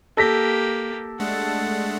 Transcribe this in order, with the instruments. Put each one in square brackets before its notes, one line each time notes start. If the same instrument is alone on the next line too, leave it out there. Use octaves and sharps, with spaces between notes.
[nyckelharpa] A#3 G4 [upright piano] A4 A#6 B6
[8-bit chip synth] G#3 A3 D4 [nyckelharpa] F#5 A5